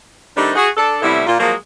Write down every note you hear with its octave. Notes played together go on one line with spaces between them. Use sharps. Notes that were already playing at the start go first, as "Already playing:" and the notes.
D#3 G3 A3 C4 D4 D#4
F#4 G#4
D4 A4
A2 C3 G3 B3 E4
A#2 F4
F3 F#3 G#3 A#3